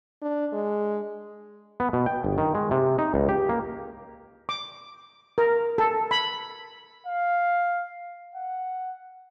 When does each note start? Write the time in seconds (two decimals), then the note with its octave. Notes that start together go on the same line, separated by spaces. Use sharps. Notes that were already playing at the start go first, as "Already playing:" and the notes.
0.22 D4
0.52 G#3
1.80 B3
1.93 B2
2.06 G5
2.24 G1
2.38 D#3
2.55 G#3
2.71 C3
2.99 D#4
3.14 C#2
3.29 G4
3.49 A#3
4.49 D6
5.38 A#4
5.78 A4
6.11 B5
7.06 F5
8.35 F#5